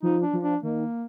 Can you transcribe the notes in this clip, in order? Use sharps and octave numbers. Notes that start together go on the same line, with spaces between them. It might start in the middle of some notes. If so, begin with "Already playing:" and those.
F3 D#4
D4
F3
D4
D#3 A#3